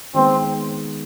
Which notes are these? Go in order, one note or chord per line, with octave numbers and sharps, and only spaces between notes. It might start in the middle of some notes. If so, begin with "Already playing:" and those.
D#3 G#3 B3 C4